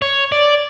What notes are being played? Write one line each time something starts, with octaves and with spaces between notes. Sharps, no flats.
C#5
D5